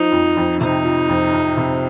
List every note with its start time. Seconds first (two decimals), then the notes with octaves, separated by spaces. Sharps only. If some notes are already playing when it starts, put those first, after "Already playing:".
Already playing: F3 D#4
0.12 F2
0.37 F2
0.61 C3 D#4
0.84 F3
1.09 F2
1.33 F2
1.57 C3